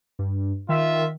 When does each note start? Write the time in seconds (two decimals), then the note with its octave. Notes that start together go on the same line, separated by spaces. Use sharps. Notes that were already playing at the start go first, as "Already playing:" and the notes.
0.19 G2
0.69 D#3 F4 E5